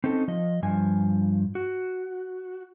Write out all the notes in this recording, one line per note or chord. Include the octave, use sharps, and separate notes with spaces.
C4 C#4 D#4 A4
F3 D#5
G2 F3 G#5
F#4